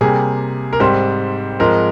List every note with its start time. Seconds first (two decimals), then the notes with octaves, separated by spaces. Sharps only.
0.01 C3 G3 A#3 G#4
0.73 A#4
0.80 G#2 G3 C4 C5
1.60 G#2 F3 G#3 C4 A#4